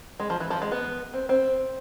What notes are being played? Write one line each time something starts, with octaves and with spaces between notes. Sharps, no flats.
G#3
F3
E3
F3
G#3
B3
C4
C4